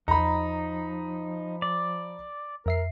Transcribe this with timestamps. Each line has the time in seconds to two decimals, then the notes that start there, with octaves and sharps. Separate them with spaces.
0.08 E2 F3 D#4 A#5 B5
1.62 D5
2.66 F2 A#4 E5 C7